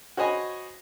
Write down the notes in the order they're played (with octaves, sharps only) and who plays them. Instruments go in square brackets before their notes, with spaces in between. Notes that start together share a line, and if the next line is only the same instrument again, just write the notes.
[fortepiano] F#4 C5 C#5 D#5 G#5 B5